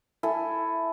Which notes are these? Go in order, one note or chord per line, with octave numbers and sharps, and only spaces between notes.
E4 A4 G#5